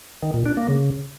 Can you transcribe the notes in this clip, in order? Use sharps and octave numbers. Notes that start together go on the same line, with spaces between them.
D#3
A#2
D4
A#3
C#3